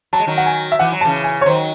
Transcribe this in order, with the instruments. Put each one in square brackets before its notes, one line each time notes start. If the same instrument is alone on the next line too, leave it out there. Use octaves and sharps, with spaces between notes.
[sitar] F#3 [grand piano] A5
[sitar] G#3
D#3 F#3
[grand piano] F#5
G#5
E5
[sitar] E3 [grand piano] F#5
[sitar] F#3
[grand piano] A5
[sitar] C#3 E3
[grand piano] G#5
C#5
[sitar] D#3 F#3 [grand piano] C5